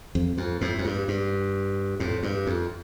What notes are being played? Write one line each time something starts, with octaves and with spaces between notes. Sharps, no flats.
F2
F2
F2 A2
F2
G2
G2
F2 A2
G2
F2